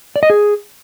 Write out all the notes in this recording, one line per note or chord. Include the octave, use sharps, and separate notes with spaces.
D5
D#5
G#4